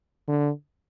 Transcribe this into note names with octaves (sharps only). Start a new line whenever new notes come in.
D3